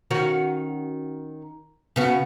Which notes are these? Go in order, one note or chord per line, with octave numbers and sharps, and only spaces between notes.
D#3 C#4 F#4
C#3 B3 F#4